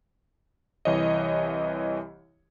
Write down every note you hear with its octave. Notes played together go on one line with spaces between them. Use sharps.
C2 E3 C#5 D#5